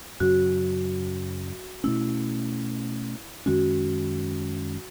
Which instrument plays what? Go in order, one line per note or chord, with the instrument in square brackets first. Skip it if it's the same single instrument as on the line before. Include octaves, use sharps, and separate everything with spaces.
[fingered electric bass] F#2 C#3 F#3 [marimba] F#4
[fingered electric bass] B2 A3 C#4 [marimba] E4
[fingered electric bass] F#2 D#3 G#3 C#4 [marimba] F#4